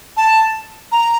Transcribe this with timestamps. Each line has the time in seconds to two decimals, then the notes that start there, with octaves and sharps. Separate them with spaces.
0.17 A5
0.92 A#5